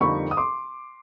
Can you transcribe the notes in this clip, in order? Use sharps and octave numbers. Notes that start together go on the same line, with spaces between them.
F2 D3 G3 A#3 D#4 B5 C#6
D#6
C6 D6